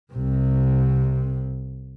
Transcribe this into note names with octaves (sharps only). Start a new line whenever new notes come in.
C2 C3